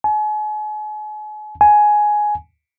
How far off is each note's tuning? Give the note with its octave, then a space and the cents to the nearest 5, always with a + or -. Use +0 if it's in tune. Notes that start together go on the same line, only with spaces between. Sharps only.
G#5 +40
G#5 +10